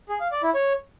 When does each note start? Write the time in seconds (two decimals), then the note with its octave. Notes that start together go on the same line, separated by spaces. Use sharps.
0.09 G#4
0.20 F5
0.32 D5
0.43 E4
0.54 C#5